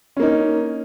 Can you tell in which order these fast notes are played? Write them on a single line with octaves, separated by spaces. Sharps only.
C#4 A#3 D#4